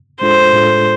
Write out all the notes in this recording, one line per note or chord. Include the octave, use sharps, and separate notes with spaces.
A2 G#3 D4 F4 A4 C5
A2 G#3 D4 F4 A4